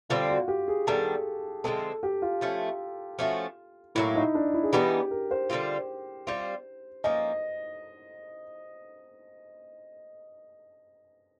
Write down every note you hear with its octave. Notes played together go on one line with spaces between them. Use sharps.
D3 G3 C4 F4
F#4
G4
G#4
D#3 G3 B3 D4 A4
D3 F3 G#3 C4 A4
G4
F4
F3 A3 C#4
F3 A3 C#4 F#4
A2 F#3 A#3 E4
D#4
D4
E4
G#4
E3 G3 B3 D#4 G4
A#4
C5
D3 G3 C4 F4
G3 C4 F4
F3 A#3 C#4 D#5